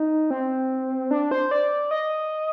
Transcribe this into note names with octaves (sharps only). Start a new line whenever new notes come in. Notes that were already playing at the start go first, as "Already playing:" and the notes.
Already playing: D#4
C4
D4
C5
D5
D#5